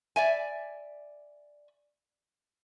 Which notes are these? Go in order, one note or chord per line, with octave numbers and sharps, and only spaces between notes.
D5 E5 G#5